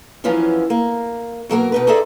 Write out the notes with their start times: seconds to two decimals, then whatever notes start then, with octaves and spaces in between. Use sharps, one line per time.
0.24 F#2 E3 F3 B3 C#4 F4
0.70 A#3
1.49 B2 F#3 A#3 A#4
1.72 B2 D#4 B4
1.87 D#4 G#4 A4 C5 D5 E5